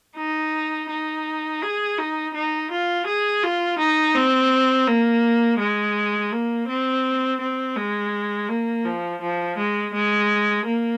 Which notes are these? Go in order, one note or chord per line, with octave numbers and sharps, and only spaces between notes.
D#4
D#4
G#4
D#4
D#4
F4
G#4
F4
D#4
C4
A#3
G#3
A#3
C4
C4
G#3
A#3
F3
F3
G#3
G#3
A#3